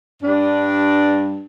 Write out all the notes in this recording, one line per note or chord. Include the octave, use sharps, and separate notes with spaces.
G2 D4